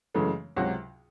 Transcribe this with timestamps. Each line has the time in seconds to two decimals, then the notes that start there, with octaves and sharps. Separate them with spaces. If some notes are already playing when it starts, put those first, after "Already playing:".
0.15 F#2 C#3 E3 G#3 A3
0.56 C#2 C3 F#3 F#4